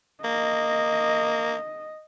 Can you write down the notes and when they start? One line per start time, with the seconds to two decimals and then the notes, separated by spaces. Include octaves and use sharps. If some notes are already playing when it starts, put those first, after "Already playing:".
0.24 A#3 D#5